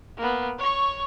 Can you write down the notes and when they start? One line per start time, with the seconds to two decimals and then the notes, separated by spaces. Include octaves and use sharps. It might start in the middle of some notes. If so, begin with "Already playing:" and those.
0.18 A#3 B3
0.59 C#5 C#6